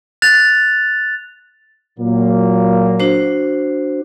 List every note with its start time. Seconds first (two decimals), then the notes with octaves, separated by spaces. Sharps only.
0.22 F#6 A6 F7
1.99 A#2 F#3 A#3
3.00 D4 F#4 C5